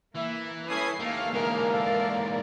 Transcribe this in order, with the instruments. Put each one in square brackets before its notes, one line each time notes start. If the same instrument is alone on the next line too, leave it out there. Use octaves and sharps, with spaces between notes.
[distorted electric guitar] E3 [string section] A#3 [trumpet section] E5
[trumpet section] C#4 A4 G#5 [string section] B5 D#6 C7
[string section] D#2 F5 [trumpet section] A3 [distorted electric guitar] A#3
[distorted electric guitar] G#2 E3 [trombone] A#3 [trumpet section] D4 G#4 A#4
[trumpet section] A4 F5 [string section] A#4 D5